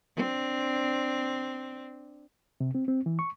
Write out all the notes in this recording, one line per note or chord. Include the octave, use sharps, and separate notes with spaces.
C4 D4
C3
C4
C4
E3
C#6